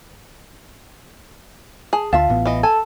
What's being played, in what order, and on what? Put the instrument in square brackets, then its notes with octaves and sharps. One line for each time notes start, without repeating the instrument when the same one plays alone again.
[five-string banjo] G#4 [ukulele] A5
[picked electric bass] D2 [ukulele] F4 E5 F5 [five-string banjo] A5
[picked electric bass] A1 A2 B3
[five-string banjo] E3 D#5
[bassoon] A4 [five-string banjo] G#5